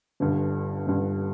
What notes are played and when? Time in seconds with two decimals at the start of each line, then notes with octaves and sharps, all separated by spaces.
0.20 G1 G2 D3
0.87 G1 G2 D3